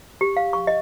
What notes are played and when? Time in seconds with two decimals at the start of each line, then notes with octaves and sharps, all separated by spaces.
0.21 G4
0.37 F5
0.53 C#6
0.67 D#5